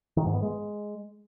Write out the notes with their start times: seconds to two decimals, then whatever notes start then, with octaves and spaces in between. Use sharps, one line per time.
0.17 D#3
0.25 G#2
0.34 B3
0.42 G#3